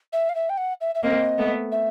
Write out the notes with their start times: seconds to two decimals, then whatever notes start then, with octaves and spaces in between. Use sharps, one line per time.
0.13 E5
0.29 F5
0.35 E5
0.49 G5
0.57 F#5
0.81 E5
0.95 E5
1.03 A#3 C4 D#5
1.38 A3 B3
1.72 E5